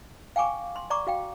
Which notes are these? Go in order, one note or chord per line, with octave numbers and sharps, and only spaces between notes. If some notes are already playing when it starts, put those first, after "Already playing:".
F5 G5 G#5 C#6 D6
C6
D5 A#5 C#6 D6
F#4 F5 G5